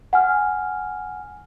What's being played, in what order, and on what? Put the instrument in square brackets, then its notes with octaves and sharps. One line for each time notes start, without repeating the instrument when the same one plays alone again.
[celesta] F#5 G#5 F6